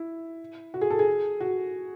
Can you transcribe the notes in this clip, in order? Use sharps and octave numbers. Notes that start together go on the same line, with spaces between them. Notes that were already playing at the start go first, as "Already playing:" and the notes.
Already playing: E4
F#4
G#4
A4
G#4
F#4